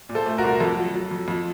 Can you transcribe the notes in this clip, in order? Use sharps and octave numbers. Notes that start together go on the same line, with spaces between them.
A#2
A4 C5
A3
F#4 A#4
C2
F2 A4
F#3
F#3
F2
F2